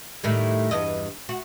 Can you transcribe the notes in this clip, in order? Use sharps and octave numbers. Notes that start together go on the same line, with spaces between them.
A2 D#3 G3
E2 G2 D#5
F#4